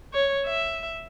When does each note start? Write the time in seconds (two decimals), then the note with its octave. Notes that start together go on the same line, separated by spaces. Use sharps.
0.14 C#5
0.46 E5